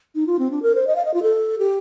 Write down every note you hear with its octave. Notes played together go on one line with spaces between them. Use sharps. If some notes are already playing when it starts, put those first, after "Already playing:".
D#4
F4
C4
D4
A#4
C5
D#5
F5
D#5
F4
A4
G4